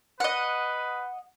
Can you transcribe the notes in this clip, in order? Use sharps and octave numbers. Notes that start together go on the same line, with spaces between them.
B4 D#5 F#5